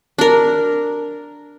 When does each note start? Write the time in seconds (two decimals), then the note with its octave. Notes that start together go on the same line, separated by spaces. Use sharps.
0.18 D4 A#4